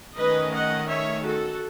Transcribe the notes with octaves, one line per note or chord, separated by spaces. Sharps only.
D#3 A3 C#4 B4 D#5
D#5 F#5
C#5 E5
F#4 A4